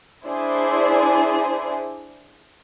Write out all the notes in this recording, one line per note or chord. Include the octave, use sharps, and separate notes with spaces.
D4 E4 G#4 C5 D5